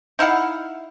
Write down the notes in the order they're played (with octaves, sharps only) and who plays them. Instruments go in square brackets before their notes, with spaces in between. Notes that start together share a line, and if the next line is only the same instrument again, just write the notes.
[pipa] D#4 E4 F5 F#5